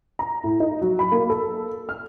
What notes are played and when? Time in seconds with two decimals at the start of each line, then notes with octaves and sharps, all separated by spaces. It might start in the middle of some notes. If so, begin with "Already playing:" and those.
0.19 A#5
0.44 A2
0.60 D#4
0.81 F#3
0.99 B5
1.12 A#3
1.30 A4
1.89 F6